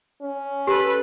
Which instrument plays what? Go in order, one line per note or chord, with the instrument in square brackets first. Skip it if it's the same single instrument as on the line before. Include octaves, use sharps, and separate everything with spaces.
[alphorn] C#4
[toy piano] G4 [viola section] A4 B4